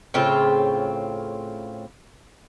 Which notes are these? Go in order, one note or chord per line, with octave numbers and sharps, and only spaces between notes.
A2 C#3 C4 F4